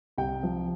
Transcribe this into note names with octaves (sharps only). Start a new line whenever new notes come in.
C2 G5
F3